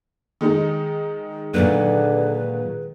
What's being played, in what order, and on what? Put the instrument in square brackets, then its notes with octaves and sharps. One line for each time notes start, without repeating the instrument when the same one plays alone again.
[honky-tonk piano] D#3 G#3 D#4
[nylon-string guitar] A#2 F#3 A#3 [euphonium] D3 [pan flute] B4